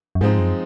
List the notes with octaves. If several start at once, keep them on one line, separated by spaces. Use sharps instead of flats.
F#2
G#2 F3 G#3 C4 D#4
F#2